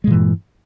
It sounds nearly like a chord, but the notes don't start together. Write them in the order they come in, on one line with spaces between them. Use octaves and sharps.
G#3 A#2 E3 G2